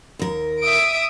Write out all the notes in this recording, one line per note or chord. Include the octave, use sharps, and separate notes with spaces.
D#2 A#4
E5 D#6 D7